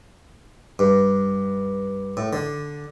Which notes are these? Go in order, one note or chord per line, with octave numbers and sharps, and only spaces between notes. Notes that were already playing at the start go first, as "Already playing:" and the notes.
G2
A2
D3